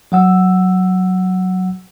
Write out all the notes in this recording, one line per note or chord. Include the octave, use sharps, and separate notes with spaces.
F#3 F#5 E6